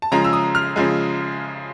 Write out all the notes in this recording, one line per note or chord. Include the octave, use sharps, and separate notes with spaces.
A5
C#3 F3 G#3 A#5
E6
D#6
F6
C#3 F3 G#3